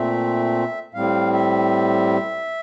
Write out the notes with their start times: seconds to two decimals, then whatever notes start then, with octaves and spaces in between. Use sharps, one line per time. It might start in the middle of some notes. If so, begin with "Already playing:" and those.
Already playing: A#2 A3 C4 E5
0.94 A2 G3 C4 F5
1.33 E5